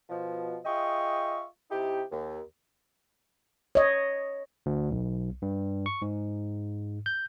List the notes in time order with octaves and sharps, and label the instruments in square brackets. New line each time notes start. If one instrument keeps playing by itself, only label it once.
[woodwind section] B2 F3
F4 G#4 D#5 E5 G5 C#6
C3 D#4 E4 G4
D#2
[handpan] C#5 D#5
[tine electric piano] D2
B1
G2
C#6
G#2
G6